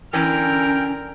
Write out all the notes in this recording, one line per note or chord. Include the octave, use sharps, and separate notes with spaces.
D3 E3 C#4 A#4 G5 F6